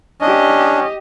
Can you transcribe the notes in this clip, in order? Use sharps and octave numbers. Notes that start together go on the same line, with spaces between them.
C#4 D4 G4 D#5